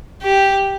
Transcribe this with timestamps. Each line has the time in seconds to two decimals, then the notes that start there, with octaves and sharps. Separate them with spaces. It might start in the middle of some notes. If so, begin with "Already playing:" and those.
0.23 G4